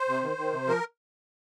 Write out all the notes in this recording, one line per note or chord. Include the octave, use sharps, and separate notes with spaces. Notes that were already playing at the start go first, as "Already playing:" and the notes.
Already playing: C5
C3
D#3
D#3
C3
F3 A#4